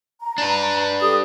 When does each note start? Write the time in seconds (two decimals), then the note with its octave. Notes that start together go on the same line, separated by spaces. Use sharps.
0.21 A#5
0.38 D4 B4
1.01 G4 A4 D#6